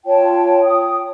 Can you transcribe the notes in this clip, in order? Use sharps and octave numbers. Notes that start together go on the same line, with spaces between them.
F4 C#5 G5 A5
G5 D#6